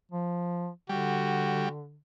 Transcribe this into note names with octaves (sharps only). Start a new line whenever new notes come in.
F3
D3 G3 F#4